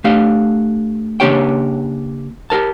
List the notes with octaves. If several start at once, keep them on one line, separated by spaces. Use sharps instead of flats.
A3 D4 G4 F5
C#3 A#3 D4 G4 C#5 G5
G4 G#4 A#4 A5